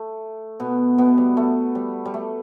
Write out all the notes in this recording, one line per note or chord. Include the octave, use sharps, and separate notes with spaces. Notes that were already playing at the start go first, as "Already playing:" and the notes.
Already playing: A3
B2 B3
B2 B3
G3
A3
G3
G3
A3